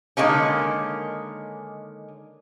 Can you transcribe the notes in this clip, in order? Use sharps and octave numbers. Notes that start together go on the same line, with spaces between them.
D3 D#3 G#3 A#3 C#4